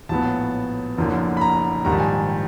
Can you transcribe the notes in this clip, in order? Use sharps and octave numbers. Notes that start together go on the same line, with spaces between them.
A#1 A2 F#3 B3 A5
F#1 F#2 D3 F3 A#3
B5
A#5
A#1 G#2 D#3 G3 A#5
A5
G#5
A5